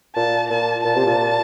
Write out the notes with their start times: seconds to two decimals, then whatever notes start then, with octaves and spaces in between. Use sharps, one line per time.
0.16 A#2 A5
0.50 A#2 A5
0.84 A#2 A5
0.96 C3
1.07 A#2